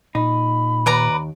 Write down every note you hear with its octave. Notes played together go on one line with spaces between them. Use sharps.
A#2 D#4 B5
D#2 B4 D5 A#5